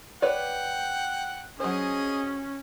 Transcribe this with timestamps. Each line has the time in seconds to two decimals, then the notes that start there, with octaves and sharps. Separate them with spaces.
0.22 B4 C#5 D5 F#5 G5
1.60 F#3 C#4 G#4 C5 D#5